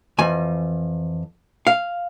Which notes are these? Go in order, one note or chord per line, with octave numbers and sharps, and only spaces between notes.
F2 E3 G#5
F5